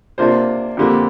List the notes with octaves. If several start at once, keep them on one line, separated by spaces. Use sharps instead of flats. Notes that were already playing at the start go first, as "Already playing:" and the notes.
C3 A#3 D4 F4 C5
F2 D3 A#3 G4